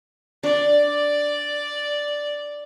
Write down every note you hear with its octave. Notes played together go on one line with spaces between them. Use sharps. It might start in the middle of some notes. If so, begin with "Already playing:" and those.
D4 D5